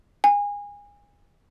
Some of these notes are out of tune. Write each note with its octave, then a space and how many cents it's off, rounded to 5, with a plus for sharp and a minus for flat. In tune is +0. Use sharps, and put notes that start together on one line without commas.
G#5 -25